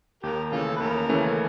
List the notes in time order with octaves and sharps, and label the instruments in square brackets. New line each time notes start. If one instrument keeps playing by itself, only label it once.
[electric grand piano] D#2 [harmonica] G4 A#4
[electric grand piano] C#3 E3 A3 C#4 [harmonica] F4 A4
[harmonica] B4
[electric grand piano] D#2 [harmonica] A#4
[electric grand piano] C#3 E3 A3 C#4